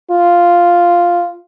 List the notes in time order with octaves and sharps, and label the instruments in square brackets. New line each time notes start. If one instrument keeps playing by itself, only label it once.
[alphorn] F4